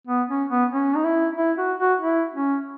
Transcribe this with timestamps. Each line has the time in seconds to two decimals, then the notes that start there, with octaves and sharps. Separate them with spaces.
0.07 B3
0.29 C#4
0.50 B3
0.72 C#4
0.96 D#4
1.05 E4
1.37 E4
1.58 F#4
1.79 F#4
2.01 E4
2.34 C#4